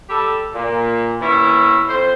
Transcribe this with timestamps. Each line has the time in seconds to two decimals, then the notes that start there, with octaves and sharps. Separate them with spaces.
0.10 G3 G4 A4
0.54 A#2
1.21 D#2 B3 C#4 E4 E5
1.88 F2 C5